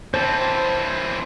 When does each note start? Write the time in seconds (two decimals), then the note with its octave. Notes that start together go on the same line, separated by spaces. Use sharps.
0.14 E3 C4 C5 A5